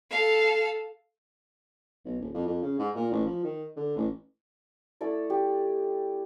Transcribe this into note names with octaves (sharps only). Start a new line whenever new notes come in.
A4 F5
B1
D#1
F2
F2
C#3
G#2
A#2
A1
F3
D#3
D3
A1
A3 E4 A4 D5
G4